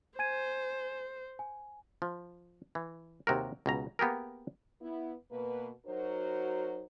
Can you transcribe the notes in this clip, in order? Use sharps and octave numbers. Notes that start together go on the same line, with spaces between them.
C5 G#5 G#6 D#7
G#5
F3
E3
D#2 C3 F#4 A#4
C#2 B2 A#5
A#3 B3 G4 G#4 A#4
B3 E4
B2 A#3 B4
F#3 D#4 F#4 A#4 C5